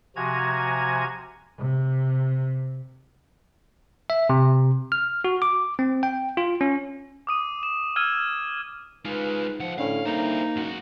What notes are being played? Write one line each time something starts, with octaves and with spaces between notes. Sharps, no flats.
C3 F3 F#4 G#5 A#5 G#6
C3
E5
C3
F6
F#4
D6
C4
G5
F4
C#4
D6 D#6 D#7
E7
E6 F6 G#6 D#7
G#2 G#3 F4 B4
C#2 F3 F#5
A2 D3 C#4 F5
D3 A#3 D#4 E4 C5
F#1 G#2 F#4